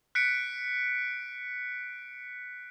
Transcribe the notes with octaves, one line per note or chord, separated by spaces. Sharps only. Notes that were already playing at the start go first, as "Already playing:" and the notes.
F#6 B6 C#7 D7